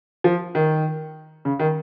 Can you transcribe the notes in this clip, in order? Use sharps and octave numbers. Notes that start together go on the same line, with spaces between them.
F3
D#3
C#3
D#3